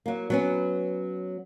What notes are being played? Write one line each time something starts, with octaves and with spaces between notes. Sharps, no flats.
F#3 A#3
F#3 B3 C#4